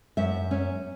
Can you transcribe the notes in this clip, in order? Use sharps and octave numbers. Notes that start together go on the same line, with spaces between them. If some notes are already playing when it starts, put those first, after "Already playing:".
F#2 E5
C#4